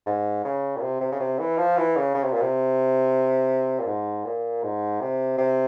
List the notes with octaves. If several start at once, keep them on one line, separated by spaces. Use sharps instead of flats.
G#2
C#3
A#2
C3
C3
C#3
C3
E3
F3
E3
C#3
C#3
C3
A#2
C3
A#2
G#2
A#2
G#2
C3
C3